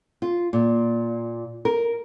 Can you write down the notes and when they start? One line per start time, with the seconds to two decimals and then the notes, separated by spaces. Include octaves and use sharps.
0.22 F4
0.53 A#2
1.65 A#4